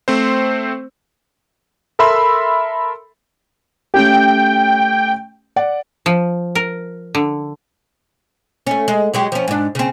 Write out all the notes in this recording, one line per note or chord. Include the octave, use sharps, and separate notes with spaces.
A3 C4 C5
A4 A#4 E5 B5 C6 E6
A3 C#4 G4 G5
D5 F#5
F3
A#4
D3
A3 C#4
G#3
F#3 G#3 G4
F3 C#4
G#2 D4
C#3 C4